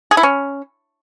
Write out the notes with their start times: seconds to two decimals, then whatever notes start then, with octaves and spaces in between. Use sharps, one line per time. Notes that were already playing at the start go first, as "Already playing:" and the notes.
0.11 G#4
0.17 E4
0.23 C#4